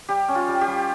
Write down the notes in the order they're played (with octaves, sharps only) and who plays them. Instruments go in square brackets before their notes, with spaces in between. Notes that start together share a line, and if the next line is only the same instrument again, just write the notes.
[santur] G3 G4
C#4
F4
G3
G4
G3